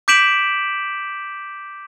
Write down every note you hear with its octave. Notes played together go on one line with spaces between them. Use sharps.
D6 G6 B6 D7 E7 F#7